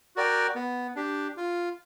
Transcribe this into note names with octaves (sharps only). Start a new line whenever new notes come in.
F#4 A#4 D5 G5
B3
D4 G4
F4